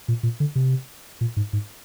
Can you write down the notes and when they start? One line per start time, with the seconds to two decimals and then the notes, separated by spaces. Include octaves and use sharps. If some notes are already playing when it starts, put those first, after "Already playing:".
0.08 A#2
0.23 A#2
0.40 D3
0.55 C3
1.21 A#2
1.37 G#2
1.53 G#2